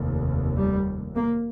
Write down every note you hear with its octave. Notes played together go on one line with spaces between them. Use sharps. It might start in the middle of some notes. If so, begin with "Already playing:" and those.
Already playing: F1 D#2
G3
A#3